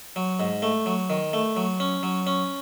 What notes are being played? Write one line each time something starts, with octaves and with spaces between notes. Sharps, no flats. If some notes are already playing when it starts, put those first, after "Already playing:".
F#3
G#2
A3
F#3
D#3
A3
F#3
C#4
F#3
C#4